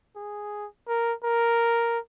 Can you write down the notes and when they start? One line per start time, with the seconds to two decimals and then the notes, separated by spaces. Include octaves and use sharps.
0.16 G#4
0.88 A#4
1.24 A#4